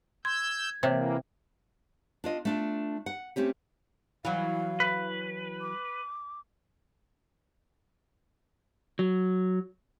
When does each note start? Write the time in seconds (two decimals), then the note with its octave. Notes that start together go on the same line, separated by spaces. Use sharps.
0.25 C6 E6 G6 G#6
0.83 C3 E3 A#3 C5 C#5 E5
2.24 D4 F4 D#5
2.45 A3 D4 F4
3.06 F#5
3.36 A3 C4 C#4 G4
4.25 E3 F#3 F5
4.80 B4
5.61 D6
8.99 F#3